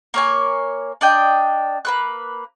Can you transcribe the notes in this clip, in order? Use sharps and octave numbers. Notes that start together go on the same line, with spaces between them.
A#3 C#5 G#5
D4 D5 D#5 G5
A#3 B4 F#6